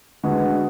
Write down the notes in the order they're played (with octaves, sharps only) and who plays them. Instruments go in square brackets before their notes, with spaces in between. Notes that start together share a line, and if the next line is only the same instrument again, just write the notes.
[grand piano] D3 G#3 B3 F#4